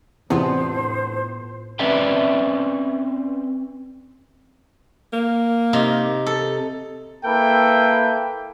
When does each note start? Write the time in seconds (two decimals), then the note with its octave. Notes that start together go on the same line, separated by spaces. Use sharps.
0.30 E2 A2 C3 B3 D4 F4 C5
1.79 C4 C#4 B4 D5 E5 G5
5.13 A#3
5.73 C3 D#4
6.26 A4
7.25 A#3 E4 A4 B4 G5